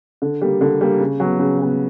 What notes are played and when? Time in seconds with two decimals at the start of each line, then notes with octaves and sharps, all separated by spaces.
0.22 D3
0.41 G3 A#3
0.61 D3
0.81 G3 A#3
1.00 C#3
1.20 F#3 B3
1.39 C#3
1.59 F#3 B3